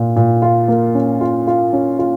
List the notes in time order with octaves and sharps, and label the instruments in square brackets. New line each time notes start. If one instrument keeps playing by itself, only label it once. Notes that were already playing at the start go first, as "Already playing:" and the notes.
Already playing: [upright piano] A#2 F4
A#2
F4
A#3
C#4
F4
F4
C#4
F4